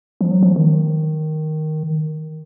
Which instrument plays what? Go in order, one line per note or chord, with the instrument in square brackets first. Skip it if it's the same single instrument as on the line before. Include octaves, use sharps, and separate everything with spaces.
[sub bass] F3
F#3
F3
D#3